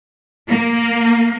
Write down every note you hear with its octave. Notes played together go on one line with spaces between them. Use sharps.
A#3